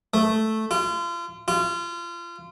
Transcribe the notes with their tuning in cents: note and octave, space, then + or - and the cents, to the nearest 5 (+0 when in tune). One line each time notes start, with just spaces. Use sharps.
A3 -5
F4 -35
F4 -30